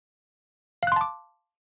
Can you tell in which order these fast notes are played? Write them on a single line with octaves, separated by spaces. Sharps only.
F5 F#6 C6 A5 D6